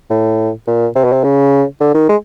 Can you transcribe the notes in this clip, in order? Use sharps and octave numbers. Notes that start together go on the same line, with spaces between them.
A2
A#2
C3
B2
C3
C#3
D3
D#3
G#3